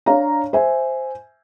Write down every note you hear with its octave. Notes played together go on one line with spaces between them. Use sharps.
D4 C#5 F5 A#5
C5 E5 G#5